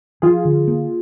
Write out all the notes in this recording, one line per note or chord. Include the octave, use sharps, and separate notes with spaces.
F3 F4 G#4
D3
A#3